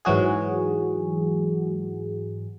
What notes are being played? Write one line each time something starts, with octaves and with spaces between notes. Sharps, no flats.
G#2 E3 F#3 F#4 G#4